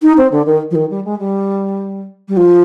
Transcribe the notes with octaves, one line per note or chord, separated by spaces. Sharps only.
D#4
C4
D3
D#3
F3
D#3
G3
G#3
G3
G3
F3